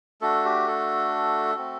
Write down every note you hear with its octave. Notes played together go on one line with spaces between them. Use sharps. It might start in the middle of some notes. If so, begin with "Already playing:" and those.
A3 D4 F#4 A4
G4
A4
A3 C4 F#4